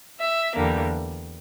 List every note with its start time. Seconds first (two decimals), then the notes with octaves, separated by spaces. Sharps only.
0.20 E5
0.55 E2 D3 G3 A#3